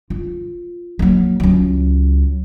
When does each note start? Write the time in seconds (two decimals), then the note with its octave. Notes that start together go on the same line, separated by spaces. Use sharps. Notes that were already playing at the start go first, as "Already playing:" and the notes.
0.10 F4
0.99 F#3 A#3
1.40 C#2 F#3